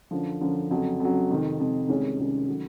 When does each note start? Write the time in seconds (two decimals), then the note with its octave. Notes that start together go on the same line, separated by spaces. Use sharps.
0.11 F#2 D3 F3
0.41 F#2 D3 F3
0.70 F2 C#3 F#3
1.00 F2 C#3 F#3
1.30 F2 C3 D#3
1.60 F2 C3 D#3
1.88 C2 C3 D#3 G#3 C#4
2.19 C2 C3 D#3 G#3 C#4
2.48 D#3 F#3 A3